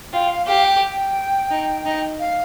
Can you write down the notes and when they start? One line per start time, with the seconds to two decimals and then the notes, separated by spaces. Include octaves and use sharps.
0.13 F4 G5
0.29 F5
0.46 G4 F5
0.64 G5
1.50 D#4
1.85 D#4
2.19 F5